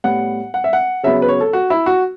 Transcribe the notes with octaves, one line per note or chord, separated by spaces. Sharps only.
A2 G3 B3 F#5
F#5
E5
F#5
C#3 F#3 B3 E5
B4
C#5
A4
F#4
E4
F#4